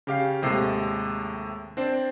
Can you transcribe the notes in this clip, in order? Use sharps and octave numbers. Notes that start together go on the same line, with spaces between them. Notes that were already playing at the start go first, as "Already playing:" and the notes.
C#3 G4 F5 C7
D#2 A2 C3 G#3 A4 C7
C4 D4 C5 D5